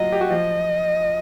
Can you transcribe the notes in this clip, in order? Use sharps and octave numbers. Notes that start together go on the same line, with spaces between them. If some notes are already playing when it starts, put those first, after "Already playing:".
Already playing: F#3 F4 F#4 D#5
G4
F#4
F3 F4 D#5